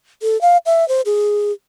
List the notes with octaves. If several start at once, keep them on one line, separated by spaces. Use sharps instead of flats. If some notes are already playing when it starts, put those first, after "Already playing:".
A4
F5
E5
C5
G#4